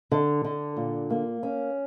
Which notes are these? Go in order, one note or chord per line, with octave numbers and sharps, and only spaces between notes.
D3
D3
A#2
A#3
C#4